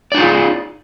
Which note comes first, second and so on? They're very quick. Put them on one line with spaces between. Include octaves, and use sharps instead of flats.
D5 D#4 F4 G#4